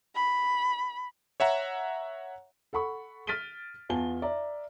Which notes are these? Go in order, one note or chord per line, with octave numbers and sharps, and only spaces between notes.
B5
C#5 E5 F#5 A#5
A4 F#5 B5 C#6
F6 A6 B6 D7 D#7 G7
E2 F4 G#5 A5 G7
D5 E5 A#5